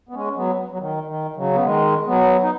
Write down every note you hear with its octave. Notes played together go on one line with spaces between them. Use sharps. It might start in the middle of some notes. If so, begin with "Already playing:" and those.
B3
G#3 C#4
F#3 B3
F#3
D#3
D#3
C#3 F#3
B3
D#3 G#3
F#3 B3
D#4